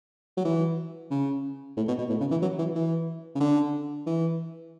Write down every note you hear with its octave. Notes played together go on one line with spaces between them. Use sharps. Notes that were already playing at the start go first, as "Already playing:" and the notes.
F#3
E3
C#3
A2
B2
B2
A2
C#3
E3
F#3
E3
E3
C#3
D3
E3